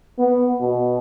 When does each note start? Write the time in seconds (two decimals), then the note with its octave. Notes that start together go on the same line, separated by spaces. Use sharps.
0.19 B3
0.60 B2